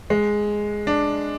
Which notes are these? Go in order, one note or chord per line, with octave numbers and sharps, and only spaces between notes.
G#3
D4